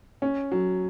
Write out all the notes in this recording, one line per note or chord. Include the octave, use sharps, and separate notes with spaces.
C#4
F#3